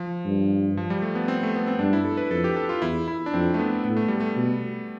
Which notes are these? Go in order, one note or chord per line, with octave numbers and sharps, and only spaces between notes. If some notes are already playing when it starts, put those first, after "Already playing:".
Already playing: F3
G2
F3
G3
A3
B3
C4
A3
B3
C4
G2 D4
E4
A4
B4
F2 A4
G4
A4
F4
E2 E4
E4
D4
F2 C4
A3
B3
A2 B3
A3
G3
A3
B2